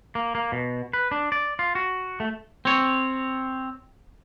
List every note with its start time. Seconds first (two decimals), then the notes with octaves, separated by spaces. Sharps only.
0.15 A#3
0.35 A#3
0.52 B2
0.93 B4
1.12 D4
1.32 D5
1.59 F4
1.75 F#4
2.20 A3
2.65 C4 C#5